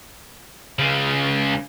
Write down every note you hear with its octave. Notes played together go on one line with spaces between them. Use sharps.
C#2 C#3